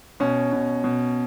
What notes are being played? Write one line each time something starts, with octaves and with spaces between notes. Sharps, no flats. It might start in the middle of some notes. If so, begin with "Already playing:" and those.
B2 C#4
B2
B2